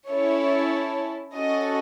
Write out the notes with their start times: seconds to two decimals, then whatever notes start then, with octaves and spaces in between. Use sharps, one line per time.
0.09 C#4 E4 A4 C#5
1.34 C#4 F#4 A4 D#5